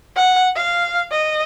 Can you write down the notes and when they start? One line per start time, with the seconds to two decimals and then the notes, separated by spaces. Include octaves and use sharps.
0.16 F#5
0.56 F5
1.11 D#5